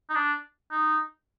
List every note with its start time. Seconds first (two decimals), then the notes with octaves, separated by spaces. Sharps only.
0.10 D#4
0.15 D4
0.71 D#4